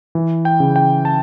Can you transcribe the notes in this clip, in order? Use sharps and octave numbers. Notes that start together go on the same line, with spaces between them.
E3
G5
C#3
G5
A5